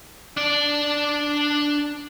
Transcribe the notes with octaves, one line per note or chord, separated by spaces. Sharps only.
D4 D5